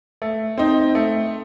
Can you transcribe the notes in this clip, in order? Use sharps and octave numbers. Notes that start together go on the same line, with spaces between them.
A3
C4 D#4
A3